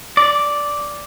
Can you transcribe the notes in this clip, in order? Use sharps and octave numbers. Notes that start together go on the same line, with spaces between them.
D5